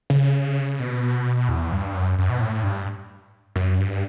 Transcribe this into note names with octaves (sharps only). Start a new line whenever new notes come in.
C#3
B2
E2
G2
F#2
F#2
B2
A2
G2
F#2
G2